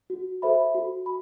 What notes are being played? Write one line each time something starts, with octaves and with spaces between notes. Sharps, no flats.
F#4
A4 C5 E5 B5
F#4
B5